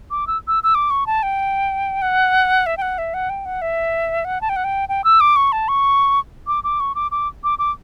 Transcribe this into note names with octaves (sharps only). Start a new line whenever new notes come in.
D6
E6
E6
E6
D6
C#6
A5
G5
F#5
E5
G5
F#5
E5
F#5
G5
F#5
E5
F#5
A5
G5
F#5
G5
G5
E6
D6
C#6
A5
C#6
D6
D6
C#6
D6
D6
D6
D6